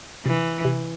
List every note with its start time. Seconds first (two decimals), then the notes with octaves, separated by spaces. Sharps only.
0.26 C3 E3
0.65 C3